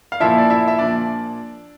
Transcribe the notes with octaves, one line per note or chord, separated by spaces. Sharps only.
F5
A#2 F3 E4 E5
D5
E4 E5
E5
A#2 F3 D4 D5